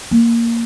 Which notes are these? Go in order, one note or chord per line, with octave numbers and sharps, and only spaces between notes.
A#3